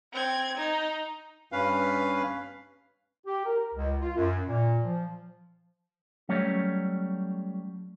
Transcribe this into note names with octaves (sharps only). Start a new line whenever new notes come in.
C4 G#6
D#4
G2 C#4 B4 F5
G4
A#4
C#2
F4
F#2
A#2
F3
F#3 G3 A3 C#4 C#5